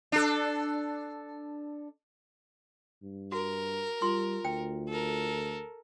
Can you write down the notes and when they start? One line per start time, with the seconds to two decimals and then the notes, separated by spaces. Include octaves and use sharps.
0.12 D4 A4
3.03 G2
3.32 F#4 A#4
4.02 G3 F4 C6
4.45 D2 G5
4.89 A4 A#4